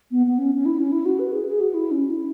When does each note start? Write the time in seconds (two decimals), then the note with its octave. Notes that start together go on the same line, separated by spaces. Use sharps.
0.11 B3
0.26 B3
0.38 C#4
0.55 C#4
0.65 E4
0.78 C#4
0.92 E4
1.05 F#4
1.19 B4
1.32 G#4
1.46 G#4
1.60 F#4
1.74 E4
1.91 C#4
2.10 E4